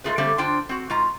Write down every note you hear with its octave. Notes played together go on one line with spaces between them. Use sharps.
G#2 A3 F4 G#4 B4
D3 G3 A3 A#3 C4
D3 D4 F4 C5 G5
C4 F#4
G#2 F4 A#5